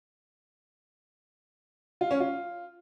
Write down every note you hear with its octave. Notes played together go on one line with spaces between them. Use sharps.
F4
C#4
F4